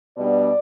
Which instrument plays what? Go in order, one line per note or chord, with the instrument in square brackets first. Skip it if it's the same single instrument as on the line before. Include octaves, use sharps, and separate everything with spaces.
[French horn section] B2 G3 B3 D4 D5